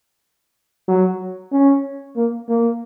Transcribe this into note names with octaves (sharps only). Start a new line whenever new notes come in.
F#3
C#4
A#3
A#3